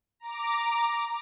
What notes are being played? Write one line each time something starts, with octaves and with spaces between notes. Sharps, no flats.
A#5 D6